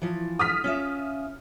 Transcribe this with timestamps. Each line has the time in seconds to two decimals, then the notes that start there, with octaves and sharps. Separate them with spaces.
0.02 E3 F3
0.39 D#6 F6 B6
0.64 C#4 F4 E5